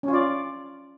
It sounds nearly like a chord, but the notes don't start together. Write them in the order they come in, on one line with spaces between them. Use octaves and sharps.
C#4 F4 D5